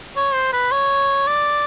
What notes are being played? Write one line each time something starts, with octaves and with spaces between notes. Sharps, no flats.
C#5
C5
B4
C#5
D5